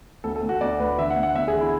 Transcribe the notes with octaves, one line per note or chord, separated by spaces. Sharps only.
D2 A4
A4
D2
F#4
D2 D5
D2 B4
D3 E5
F#5
D2
F#5
D2 E5
G#4
D3
E4